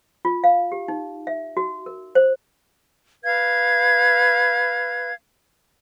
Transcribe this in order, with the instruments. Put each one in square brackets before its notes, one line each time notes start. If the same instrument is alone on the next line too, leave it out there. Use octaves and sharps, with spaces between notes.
[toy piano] F4
F5
G4
D#4
E5
F#4
A#4
C5
[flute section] B4 F5 G#6